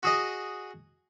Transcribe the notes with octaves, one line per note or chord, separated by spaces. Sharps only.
F#4 G#4 D#5